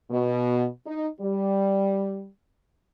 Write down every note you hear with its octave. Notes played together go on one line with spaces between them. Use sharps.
B2
D#4
G3